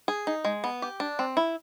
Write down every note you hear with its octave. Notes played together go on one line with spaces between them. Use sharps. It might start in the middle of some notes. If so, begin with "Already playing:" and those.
G#4
D#4
G#3
B3
G4
D4
C4
E4